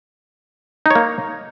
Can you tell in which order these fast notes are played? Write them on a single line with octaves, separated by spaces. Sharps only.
D#4 C#5 A#3